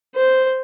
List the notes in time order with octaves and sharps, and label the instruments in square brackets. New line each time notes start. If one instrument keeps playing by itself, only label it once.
[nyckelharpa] C5